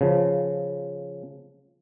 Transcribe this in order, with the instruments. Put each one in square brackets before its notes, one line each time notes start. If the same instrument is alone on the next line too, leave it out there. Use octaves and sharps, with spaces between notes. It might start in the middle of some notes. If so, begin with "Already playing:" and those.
[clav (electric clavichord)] C#3 F3